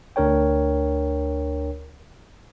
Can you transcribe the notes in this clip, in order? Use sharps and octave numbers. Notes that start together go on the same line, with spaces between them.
D2 D4 A#4 C#5 G5